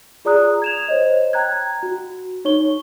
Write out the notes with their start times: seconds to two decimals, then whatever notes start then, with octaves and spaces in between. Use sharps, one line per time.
0.25 F4 G#4 D5 A#5 D#6 F#6
0.62 G#6 E7 F7
0.89 C5 C#5 D#5
1.33 G5 A#5 F#6 G#6
1.83 F#4
2.45 D#4 C#5 C#6 G7